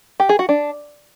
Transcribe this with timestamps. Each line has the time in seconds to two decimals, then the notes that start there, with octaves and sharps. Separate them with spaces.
0.20 G4
0.29 G#4
0.39 F#4
0.49 D4